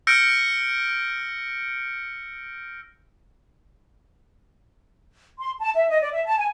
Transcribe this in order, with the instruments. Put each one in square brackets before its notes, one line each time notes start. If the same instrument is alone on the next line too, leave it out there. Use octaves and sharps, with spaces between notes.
[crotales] E6 F6 G6 A#6 C#7 D7
[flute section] C6
A5
E5
D#5
D5
E5
A5
G#5